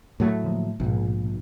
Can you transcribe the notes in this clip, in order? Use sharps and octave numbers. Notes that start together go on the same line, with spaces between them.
A2 F#3 A3
D3 F3 A#3
A#1 G#2 B2